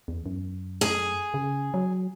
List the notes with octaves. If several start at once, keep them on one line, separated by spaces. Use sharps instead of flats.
E2
F#2
G#4
C#3
F#3